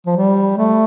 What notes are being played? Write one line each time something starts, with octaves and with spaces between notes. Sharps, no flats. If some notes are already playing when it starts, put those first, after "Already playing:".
F3
G3
A3